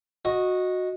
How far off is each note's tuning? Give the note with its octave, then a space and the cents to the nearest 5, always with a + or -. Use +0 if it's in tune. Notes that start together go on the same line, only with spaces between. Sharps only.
F#4 -15 D#5 +0